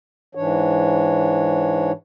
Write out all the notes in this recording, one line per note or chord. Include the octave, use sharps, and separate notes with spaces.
G#2 E3 D4 C#5